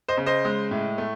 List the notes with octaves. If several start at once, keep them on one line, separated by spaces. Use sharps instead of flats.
C5 D#5
C#3
C5 D#5
G#3
A2
A3